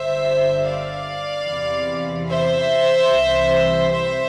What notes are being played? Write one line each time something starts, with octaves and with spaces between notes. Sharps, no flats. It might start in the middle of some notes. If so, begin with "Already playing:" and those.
Already playing: G1 G2 D3 C5 E5
D5 F5
E2 C3 E3
C5 E5
C2 C3 E3
C5 E5